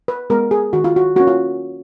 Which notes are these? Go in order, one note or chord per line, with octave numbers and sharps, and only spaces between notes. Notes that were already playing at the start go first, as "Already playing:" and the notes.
B4
G#3 B3 A#4
G#4
D#3 F#4
F4
F#4
A#3 C#4 F#4
F4